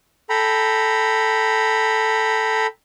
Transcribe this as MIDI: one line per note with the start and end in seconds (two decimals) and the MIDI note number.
0.30 2.67 69
0.30 2.67 79
0.30 2.67 82
0.30 2.67 83